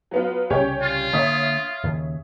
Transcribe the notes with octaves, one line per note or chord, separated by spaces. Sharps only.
F#3 B3 F4
C2 C#3 G3 C#4 G4 C#5
F4
D3 A#3 D4 C#5 E5 D#6
D#2 C#3